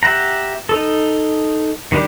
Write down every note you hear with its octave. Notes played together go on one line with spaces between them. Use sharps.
G4 E5 F#5 A#5
D#4 A4
D#3 G3 D4 G4